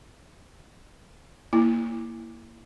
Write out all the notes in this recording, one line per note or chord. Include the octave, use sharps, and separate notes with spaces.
A#3 E4